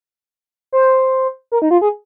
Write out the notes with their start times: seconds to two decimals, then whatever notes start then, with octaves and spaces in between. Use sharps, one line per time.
0.72 C5
1.52 A#4
1.62 D#4
1.71 F4
1.81 G#4